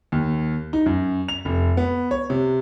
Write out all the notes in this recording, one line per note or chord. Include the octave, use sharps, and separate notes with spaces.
D#2
D#4
F#2
F7
F1
B3
C#5
C3